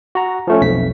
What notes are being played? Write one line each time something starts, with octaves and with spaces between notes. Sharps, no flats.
F#4 A#5
F3 A3 C#4
B1 F2 B6